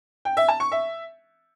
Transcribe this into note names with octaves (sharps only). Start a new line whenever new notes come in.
G5
E5
A5
C#6
E5